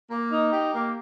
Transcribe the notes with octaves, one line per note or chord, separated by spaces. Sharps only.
A#3
D#4
G4
A#3